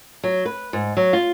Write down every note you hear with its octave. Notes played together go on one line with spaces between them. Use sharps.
F#3
B4
G#2
F#3
F4